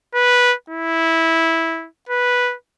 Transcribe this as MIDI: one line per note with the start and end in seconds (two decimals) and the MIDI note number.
0.14 0.54 71
0.70 1.88 64
2.09 2.55 71